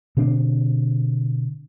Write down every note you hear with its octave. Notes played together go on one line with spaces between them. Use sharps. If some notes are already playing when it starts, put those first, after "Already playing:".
B2 D3 C4 D4